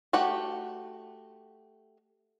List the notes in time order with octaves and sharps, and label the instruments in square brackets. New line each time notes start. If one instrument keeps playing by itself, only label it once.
[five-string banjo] A3 F#4 G4 F#5